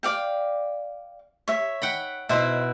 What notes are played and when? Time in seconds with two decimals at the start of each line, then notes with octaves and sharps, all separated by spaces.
0.03 D5 F5 G5
1.48 C#5 E5
1.82 F#5 G5 B5
2.29 B2 E4 C5 E5